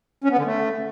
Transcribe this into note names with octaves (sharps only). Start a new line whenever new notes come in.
C#4
B3
D3
A3